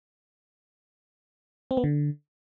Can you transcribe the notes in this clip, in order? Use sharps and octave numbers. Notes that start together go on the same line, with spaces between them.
C4
B3
D3